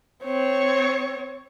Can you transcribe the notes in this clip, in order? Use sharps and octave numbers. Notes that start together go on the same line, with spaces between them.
C4 C#5